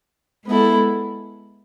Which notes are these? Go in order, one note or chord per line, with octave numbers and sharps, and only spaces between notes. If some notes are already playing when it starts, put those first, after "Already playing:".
G#3 B3 E4 A4